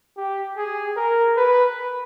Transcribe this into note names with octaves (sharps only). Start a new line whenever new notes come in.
G4
G#4
A#4
B4